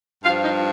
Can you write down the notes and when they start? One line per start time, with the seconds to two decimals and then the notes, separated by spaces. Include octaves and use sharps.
0.24 G2 F4 F5
0.28 F3
0.44 D#4 D#5